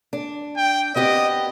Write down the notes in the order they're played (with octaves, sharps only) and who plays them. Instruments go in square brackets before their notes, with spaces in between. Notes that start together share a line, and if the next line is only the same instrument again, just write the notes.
[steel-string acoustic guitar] D4
[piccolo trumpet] G5
[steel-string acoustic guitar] B3 C4 G4 [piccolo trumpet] D#5